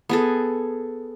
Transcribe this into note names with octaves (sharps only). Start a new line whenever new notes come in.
B3 G#4 A4